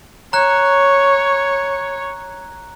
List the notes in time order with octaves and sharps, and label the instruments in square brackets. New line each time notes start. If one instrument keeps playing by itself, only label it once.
[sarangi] C#5 [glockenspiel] A#5 F#6